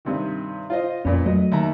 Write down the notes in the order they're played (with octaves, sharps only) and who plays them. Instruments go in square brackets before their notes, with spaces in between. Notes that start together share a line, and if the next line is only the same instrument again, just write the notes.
[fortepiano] G2 C3 D#3
F4 C5 D#5
[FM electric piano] F2 C#4 [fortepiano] A#2 B3
[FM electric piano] F#3 A3 [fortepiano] D#5
[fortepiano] D#2 E5 A#5